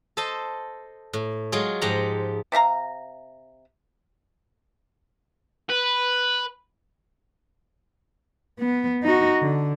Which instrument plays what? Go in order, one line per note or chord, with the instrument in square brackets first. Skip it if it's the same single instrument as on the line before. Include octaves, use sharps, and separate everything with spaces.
[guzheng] A4 C5 D#5 A5
A2
F#3 G#3 F4 G#4
G#2 F3 G4 F#5 A#5
[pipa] C3 E5 F5 A#5
[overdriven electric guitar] B4
[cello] B3
D#4 F#4
D3